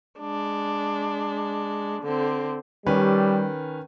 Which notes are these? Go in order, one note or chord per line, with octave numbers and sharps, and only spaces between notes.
G#3 D4
D3 C4
D#3 G3 C#4 B4